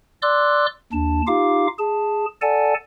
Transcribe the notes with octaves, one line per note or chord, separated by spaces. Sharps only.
D5 C6 D6 E6 F#6
D#2 D4 A5
D#4 F4 G4 F5 D6
G#4 A5
A4 D5 F#5 G#5 A5